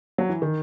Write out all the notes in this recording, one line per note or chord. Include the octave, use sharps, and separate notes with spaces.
F#3
E3
D#3